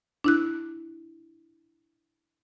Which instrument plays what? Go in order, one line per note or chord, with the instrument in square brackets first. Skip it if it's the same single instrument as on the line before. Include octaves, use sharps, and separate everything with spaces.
[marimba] D4 E4 F#6